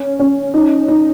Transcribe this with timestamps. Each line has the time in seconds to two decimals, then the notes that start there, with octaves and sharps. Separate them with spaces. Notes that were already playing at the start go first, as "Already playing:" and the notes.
Already playing: C#4
0.19 C#4
0.54 D#4
0.88 D#4